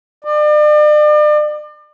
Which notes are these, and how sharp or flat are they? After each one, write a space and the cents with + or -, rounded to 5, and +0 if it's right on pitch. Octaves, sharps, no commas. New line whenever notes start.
D5 +40